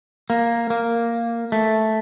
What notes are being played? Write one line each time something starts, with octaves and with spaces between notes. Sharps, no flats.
A#3
A#3
A3